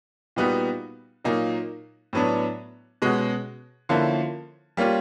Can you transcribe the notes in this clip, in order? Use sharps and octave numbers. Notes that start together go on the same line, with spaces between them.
A#2 G3 B3 D#4 F#4
A#2 F#3 A#3 D#4
A2 F#3 B3 D4
B2 G#3 C#4 F#4
D3 F3 A#3 C#4 E4
G3 A#3 C#4 F4